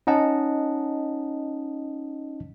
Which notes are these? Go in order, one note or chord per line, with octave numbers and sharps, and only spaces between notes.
C#4 D#4 D#5 F#5 A5